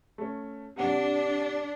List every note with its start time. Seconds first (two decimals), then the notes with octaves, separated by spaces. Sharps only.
0.18 A3 C#4
0.76 C3 D4 F#5